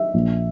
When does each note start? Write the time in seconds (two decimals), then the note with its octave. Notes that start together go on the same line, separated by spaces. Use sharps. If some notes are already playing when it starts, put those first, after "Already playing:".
Already playing: E5
0.14 A#1